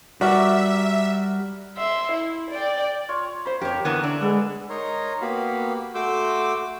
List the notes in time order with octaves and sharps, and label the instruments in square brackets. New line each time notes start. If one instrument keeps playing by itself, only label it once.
[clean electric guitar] G3 [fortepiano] F#4 [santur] A#4 D5 [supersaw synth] E5
[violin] E5 C6
E4
D5 G5
[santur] F4 C#5
[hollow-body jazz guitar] C5 B5
[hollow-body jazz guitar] F2 [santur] A#3 [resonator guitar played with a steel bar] G4 C#5
[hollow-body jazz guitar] D3 [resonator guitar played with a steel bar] E3 B3 A#4 [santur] G#5
[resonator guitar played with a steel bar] D4 [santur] E6
[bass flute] G#3 [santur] B3 A4
[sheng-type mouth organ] D#4 A#4 C#5 D#5 A#5 C6
A#3 B3 F#4 G4 F5 B5
A3 F#4 C6 D6 E6 G6